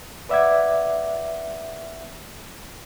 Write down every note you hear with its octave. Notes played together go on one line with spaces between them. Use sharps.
B4 D5 E5 F#5 D6 G#6